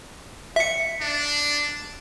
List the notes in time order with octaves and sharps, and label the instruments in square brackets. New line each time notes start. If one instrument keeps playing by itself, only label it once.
[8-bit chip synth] E5 C#7
[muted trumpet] D4